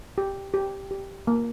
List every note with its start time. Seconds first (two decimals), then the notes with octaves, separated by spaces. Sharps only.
0.18 G4
0.54 G4
0.91 G4
1.27 A#3